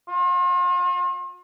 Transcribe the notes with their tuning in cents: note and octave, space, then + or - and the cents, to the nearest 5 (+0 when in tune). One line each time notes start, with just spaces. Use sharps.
F4 +40